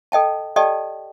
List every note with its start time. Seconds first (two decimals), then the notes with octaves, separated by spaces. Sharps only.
0.12 A4 D#5 G5 A5
0.56 G4 A4 D5 D#5 G5 A5